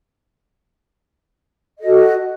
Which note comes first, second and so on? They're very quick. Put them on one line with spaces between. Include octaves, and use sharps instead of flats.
D#5 A4 F#4